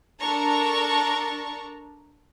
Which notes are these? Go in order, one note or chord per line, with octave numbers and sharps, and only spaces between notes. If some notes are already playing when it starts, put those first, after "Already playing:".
D4 A4 A#4 A5 A#5 C#6